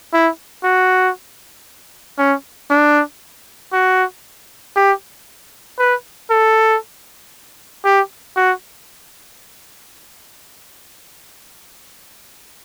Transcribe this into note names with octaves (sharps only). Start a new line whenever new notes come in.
E4
F#4
C#4
D4
F#4
G4
B4
A4
G4
F#4